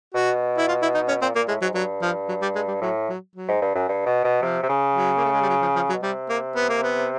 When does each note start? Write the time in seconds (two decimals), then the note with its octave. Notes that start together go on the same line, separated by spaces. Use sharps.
0.14 B2 F#4
0.58 E4
0.68 F4
0.82 E4
0.95 D#4
1.08 C#4
1.22 A#2 C4
1.35 A#2 A#3
1.48 A2 G#3
1.62 G#2 F#3
1.74 G2 F#3
2.02 F3
2.29 F#3
2.42 G3
2.55 G#3
2.68 G3
2.82 A2 F#3
3.09 F#3
3.35 F#3
3.49 G#2
3.62 G2
3.76 F#2
3.89 G2
4.06 B2
4.24 B2
4.42 C3 F3
4.63 C3
4.69 C#3
4.95 F#3
5.17 A#3
5.24 A3
5.33 G#3
5.41 G3
5.49 F#3
5.62 F3
5.75 F3
5.89 F#3
5.94 B2
6.03 C3 G3
6.29 A#3
6.56 B3
6.69 A#3
6.83 B3